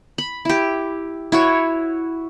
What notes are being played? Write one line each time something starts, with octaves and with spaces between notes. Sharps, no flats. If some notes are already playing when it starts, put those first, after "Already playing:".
B5
E4 G4
E4 F#4 C#5